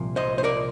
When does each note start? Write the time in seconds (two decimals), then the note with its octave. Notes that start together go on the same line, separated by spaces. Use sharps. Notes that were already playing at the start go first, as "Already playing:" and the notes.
Already playing: C2 A#2 F3
0.16 C5 D#5
0.38 C5
0.44 A#4 D5